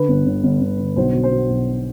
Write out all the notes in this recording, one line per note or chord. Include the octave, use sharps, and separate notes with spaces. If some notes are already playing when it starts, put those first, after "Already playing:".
Already playing: D3 B4
G1
G1
G1
G1
D3
B1 C5
B2
C5
B2
B1